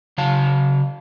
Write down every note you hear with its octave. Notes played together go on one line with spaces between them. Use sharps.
C#3 F#3 F5 A5